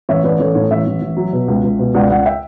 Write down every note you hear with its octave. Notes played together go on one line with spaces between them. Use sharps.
A1 C#5 E5
A1 B4 D5
A1 A4 C#5
A2 A4 C#5
A1 C#5 E5
A1
A1
F#3
B2
C#2
C#2
B2
C#2 D5 F#5
C#2 D5 F#5
E5 G5